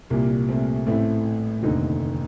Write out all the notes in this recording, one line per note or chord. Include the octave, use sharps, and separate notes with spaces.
C2 A#2 G3 A#3
A3 C4
A1 A2 A3 C4
F1 D#2 D3 C4 D#4